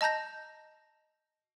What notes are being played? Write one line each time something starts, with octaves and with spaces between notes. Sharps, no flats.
D#5 A5 A#5 G6 A#6